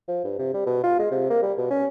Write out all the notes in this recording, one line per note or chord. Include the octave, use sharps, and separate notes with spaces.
F3
G2
C3
G3
B2
F4
G#3
C3
A#3
G3
B2
C#4